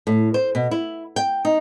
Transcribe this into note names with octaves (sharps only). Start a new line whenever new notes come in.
A2
C5
B2
E4
G5
D#4